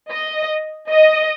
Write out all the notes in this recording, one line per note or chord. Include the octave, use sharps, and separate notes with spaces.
D#5
D#5